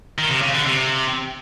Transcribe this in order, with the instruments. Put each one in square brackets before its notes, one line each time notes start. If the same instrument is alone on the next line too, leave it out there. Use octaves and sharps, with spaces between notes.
[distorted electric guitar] D#3
C3
C#3
D3
C3